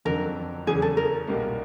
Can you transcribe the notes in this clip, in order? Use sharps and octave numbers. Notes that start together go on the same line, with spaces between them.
F2 D3 F#3 A#4
E2 C#3 F#3 G#4
A4
A#4
B1 A#2 G3 A#3